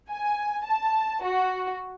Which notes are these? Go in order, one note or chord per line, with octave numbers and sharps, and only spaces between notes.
G#5
A5
F#4